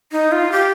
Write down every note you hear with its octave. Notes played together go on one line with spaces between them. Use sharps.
D#4
F4
G4